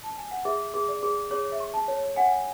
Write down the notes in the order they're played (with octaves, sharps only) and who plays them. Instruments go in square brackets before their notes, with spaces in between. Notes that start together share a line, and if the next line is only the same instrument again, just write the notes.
[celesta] A5
G#5
F#5
[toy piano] G#4 [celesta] E5
[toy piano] G#4
[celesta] D5
[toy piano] G#4
[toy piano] G#4 [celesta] C#5
[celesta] E5
[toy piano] C#6
[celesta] A5
[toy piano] C#5
[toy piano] F#5 [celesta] G#5